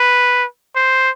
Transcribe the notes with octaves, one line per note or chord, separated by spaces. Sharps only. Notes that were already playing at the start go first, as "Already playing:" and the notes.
Already playing: B4
C5